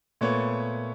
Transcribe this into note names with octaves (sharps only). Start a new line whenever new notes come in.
A#2 A3 B3 C#5